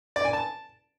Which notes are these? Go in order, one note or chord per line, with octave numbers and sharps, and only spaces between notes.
D5
G#5
A5